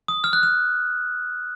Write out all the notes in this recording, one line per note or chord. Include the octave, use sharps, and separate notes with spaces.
D#6
F6
F#6
F6